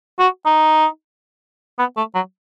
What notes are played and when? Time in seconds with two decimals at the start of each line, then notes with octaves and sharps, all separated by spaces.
0.19 F#4
0.46 D#4
1.79 B3
1.97 A3
2.15 F#3